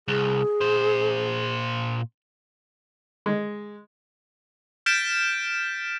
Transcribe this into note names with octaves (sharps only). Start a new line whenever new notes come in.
C2 G#4
A#2 C5
G#3
F6 G6 A6 B6 D7 E7